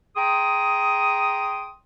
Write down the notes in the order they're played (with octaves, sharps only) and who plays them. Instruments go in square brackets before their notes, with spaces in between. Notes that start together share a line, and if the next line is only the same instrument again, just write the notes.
[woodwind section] G#4 G5 A#5 C6 D#6